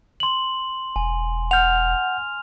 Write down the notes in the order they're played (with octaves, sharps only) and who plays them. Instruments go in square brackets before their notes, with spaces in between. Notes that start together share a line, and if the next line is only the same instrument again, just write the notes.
[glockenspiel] C6 F#7
[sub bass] E1 [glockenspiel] G#5
[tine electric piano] F#5 G6 [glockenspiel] F6 F7